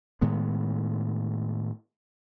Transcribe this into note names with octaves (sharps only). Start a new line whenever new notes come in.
A2 D#3 G#3 B3